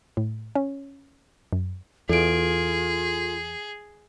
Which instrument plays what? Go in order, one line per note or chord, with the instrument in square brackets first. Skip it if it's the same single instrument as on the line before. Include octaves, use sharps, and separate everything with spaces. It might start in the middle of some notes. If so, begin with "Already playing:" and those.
[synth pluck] A2
C#4
F#2
[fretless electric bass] E2 [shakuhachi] F4 [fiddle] G#4 [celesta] A4 D7